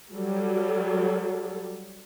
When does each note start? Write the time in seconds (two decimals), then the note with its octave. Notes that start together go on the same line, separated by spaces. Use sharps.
0.14 F#3 G3 A4